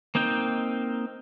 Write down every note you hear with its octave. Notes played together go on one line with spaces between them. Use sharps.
A#3 C4 D#4 G5